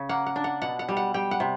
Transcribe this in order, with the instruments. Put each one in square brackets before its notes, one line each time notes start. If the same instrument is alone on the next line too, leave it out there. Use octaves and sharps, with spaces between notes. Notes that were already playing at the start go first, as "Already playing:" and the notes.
Already playing: [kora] C#3
A#3 F#5
F#5
D4
F#5
B2 F#5
F#5
G3
F#5
G3 G5
F#5
C3